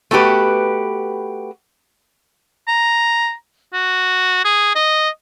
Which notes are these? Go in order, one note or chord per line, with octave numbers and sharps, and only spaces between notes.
A3 B3 F#4 G4 B4
A#5
F#4
G#4
D#5